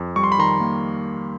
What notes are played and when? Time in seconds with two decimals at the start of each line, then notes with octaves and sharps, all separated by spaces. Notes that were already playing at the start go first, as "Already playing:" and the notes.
Already playing: F2
0.16 G3 C#6
0.24 C6
0.32 B5
0.38 D#3 A#5 C6
0.60 A#3